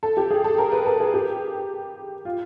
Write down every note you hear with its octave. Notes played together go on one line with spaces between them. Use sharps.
A4
G4
G#4
A4
A#4
B4
A4
G#4
G4
F4